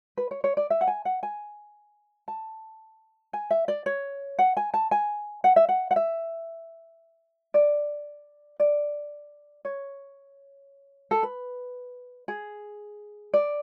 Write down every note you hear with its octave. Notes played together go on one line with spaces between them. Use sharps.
B4
C#5
C#5
D5
E5
F#5
G#5
F#5
G#5
A5
G#5
E5
D5
C#5
F#5
G#5
A5
G#5
F#5
E5
F#5
F#5
E5
D5
D5
C#5
A4
B4
G#4
D5